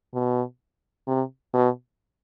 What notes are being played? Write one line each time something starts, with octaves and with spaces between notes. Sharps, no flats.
B2
C3
B2